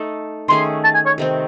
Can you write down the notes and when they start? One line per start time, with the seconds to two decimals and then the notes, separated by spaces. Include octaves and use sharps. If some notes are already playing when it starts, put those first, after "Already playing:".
Already playing: A3 D#4 A4
0.48 D#3 A3 C#4 G#4 C6
0.84 A5
0.94 G#5
1.06 C#5
1.18 C3 D#3 A3 C4